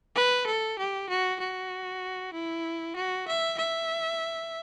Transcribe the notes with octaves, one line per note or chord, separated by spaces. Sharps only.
B4
A4
G4
F#4
F#4
E4
F#4
E5
E5